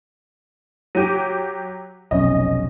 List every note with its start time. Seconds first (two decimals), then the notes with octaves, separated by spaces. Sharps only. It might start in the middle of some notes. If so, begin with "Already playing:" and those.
0.95 F#3 G4 D6 D#7
2.11 F1 B1 C#4 D#5